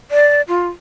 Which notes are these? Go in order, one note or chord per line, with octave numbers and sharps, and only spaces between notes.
D5
F4